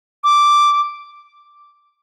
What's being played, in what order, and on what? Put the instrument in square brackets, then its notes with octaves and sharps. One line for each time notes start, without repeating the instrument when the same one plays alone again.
[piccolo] D6